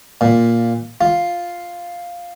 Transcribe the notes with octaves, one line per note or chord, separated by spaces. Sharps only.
A#2
F4